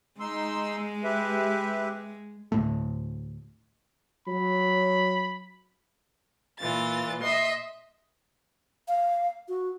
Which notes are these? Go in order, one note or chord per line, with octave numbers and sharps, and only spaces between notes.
G#3 D#4 C6 E6
G4 B4 E5
D2 A2 A3
F#3 B5
A#2 E3 F4 A6
D#5 E5 C6
F5
F#4